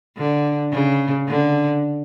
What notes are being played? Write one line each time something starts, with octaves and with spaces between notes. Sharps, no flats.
D3
C#3
D3